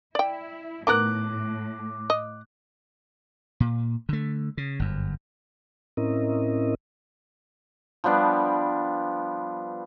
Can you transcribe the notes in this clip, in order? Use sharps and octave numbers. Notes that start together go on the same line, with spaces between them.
E4 D5 G5
A2 D#3 B3 A#4 D6 F#6
D#5
A#2
D3 A3
C#3
G1 F#2
A2 C4 C#4 E4 A#4 D#5
F3 G3 B3 D4